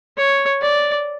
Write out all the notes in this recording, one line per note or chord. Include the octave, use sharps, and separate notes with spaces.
C#5
D5